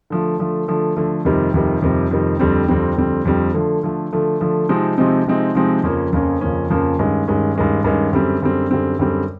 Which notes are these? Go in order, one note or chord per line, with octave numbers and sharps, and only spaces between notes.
D3 F3 A3
D3 F3 A3
D3 F3 A3
D3 F3 A3
F2 C3 D#3 G3
F2 C3 D#3 G3
F2 C3 D#3 G3
F2 C3 D#3 G3
F2 D3 G3 C4
F2 D3 G3 C4
F2 D3 G3 C4
F2 D3 G3 C4
D3 F3 A3
D3 F3 A3
D3 F3 A3
D3 F3 A3
C3 F3 G#3 C4 D#4
C3 F3 G#3 C4 D#4
C3 F3 G#3 C4 D#4
C3 F3 G#3 C4 D#4
F2 C#3 F3 A#3 C#4
F2 C#3 F3 A#3 C#4
F2 C#3 F3 A#3 C#4
F2 C#3 F3 A#3 C#4
G2 D#3 G#3 C#4
G2 D#3 G#3 C#4
G2 D#3 G#3 C#4
G2 D#3 G#3 C#4
F#2 D3 G3 C4
F#2 D3 G3 C4
F#2 D3 G3 C4
F#2 D3 G3 C4